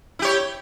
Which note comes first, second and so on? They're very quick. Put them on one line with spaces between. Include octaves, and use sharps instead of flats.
E4 G4 C#5